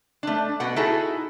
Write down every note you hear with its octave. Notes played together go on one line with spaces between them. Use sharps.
A3 D4
B2 F#5
D#4 E4 F#4 G#4 A4